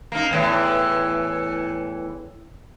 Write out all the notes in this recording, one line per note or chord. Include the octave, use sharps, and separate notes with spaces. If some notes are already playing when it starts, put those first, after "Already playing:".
A#3 D#4
E2 A2 E3